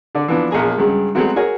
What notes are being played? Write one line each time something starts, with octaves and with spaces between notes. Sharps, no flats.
D3 D5
E3 F3 B3 D4
A#1 E2 G#4 A#5
G2 C#3 F#3 G#3
F#3 G#3 A3 B3 C4 F#4
F#4 G#4 A#4 C#5